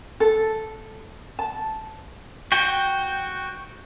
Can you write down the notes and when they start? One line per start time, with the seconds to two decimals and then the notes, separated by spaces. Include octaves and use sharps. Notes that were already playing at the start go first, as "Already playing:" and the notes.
0.20 A4
1.39 A5
2.52 F#4 G5